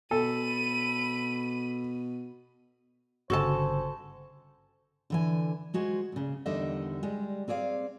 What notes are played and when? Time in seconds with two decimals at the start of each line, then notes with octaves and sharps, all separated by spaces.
0.11 B2 A4 B5 D#7
3.30 G1 C#3 F#4 A4 C5 G#5 A5
5.10 D3 E3 G#5
5.74 G#3 F#4 C5 G#5
6.12 A#2 C#3
6.46 E2 D3 D#3 G3 D#5 E5
7.03 G3 G#3
7.48 C4 G#4 D5 E5 F5